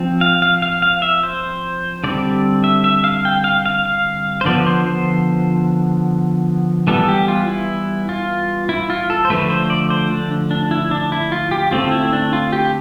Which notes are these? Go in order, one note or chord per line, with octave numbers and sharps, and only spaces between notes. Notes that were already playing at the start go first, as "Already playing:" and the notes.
Already playing: F3 C4
F5
F5
F5
F5
E5
C5
D3 G3 C4 D5
E5
E5
F5
G5
F5
F5
F5
C5
D3 F3 B3 D5
C5
C5
E3 G3 B3 A4
G4
F4
E4
F4
E4
F4
A4
C5
D3 F3 A3 B4
C5
D5
C5
D4
D4
E4
D4
E4
F4
G4
D3 A3 C4 F4
E4
D4
F4
G4